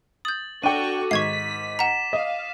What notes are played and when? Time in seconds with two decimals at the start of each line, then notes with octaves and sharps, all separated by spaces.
0.25 D#6 G6 A6 F#7
0.63 D4 F#4 A4 G5 C#6 D6 D#7
1.11 G#2 D#3 C#6 G#6 B6 C7
1.79 F#5 A#5 B6 E7
2.13 D#5 F5